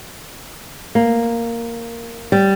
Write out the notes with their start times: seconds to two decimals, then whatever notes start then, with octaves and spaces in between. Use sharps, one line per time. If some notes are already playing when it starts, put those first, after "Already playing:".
0.95 A#3
2.32 G3